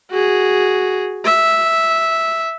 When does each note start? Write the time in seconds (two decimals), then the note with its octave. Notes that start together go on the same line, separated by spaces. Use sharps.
0.11 F#4 G#4
1.25 E5